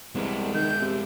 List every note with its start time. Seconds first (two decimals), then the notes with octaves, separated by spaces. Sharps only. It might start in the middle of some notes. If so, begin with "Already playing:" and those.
0.15 C2 G#3 B3
0.54 D#3 G6
0.81 C3